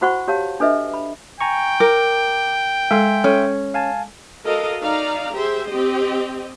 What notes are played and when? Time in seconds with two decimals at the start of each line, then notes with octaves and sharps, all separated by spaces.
0.01 E4 F#4 C5 F#5 B5 C#6
0.28 G4 C#5 F5 A5
0.60 D4 A4 B4 D#5 E5
0.94 B5
1.41 G5 G#5 A#5 C#6
1.80 A#4 D6
2.91 G#3 A4 E5 G#5 C6
3.24 C#4 A4
3.74 F5 G#5 A5
4.44 F#4 A4 A#4 D#5 F5
4.82 D#4 D5 F5 A#5
5.33 G4 G#4 C5 E5
5.68 C4 G4 D#5